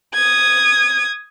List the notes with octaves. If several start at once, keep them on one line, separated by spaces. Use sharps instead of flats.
D#6 G#6